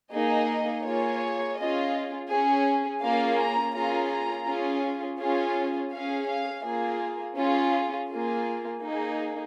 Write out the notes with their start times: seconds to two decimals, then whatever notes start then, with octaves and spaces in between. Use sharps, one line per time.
0.12 A#3 D#4 G#4 D#5
0.85 A#3 F4 G#4 C#5
1.57 C#4 F4 G#4 D#5
2.30 C#4 G#4
3.02 A#3 C#4 F4 G#4 F5
3.39 A#5
3.75 A#3 C#4 F4 G#4 A#5
4.11 A#5
4.47 C#4 F4 G#4
5.20 C#4 F4 G#4
5.92 C#4 G#4 F5
6.29 F5
6.65 A#3 F4 G#4
7.37 C#4 F4 G#4
8.10 A#3 F4 G#4
8.82 A#3 D#4 G#4